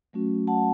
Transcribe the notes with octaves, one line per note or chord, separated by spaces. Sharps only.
F#3 A3 C#4 F#4
F#5 A5